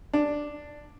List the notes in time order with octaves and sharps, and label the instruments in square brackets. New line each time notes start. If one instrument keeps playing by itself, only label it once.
[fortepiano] D4